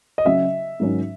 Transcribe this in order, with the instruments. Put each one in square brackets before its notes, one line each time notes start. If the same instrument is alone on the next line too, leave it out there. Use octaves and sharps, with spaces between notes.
[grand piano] D#5
[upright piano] C#3 F#3 C#4 F#4 [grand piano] E5
[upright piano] G#2 D#3 F#3 C#4